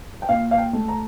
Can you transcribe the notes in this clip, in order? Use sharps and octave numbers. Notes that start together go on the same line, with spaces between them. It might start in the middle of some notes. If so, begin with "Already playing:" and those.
G5
A#2 F5
F5
G5
A3
A#5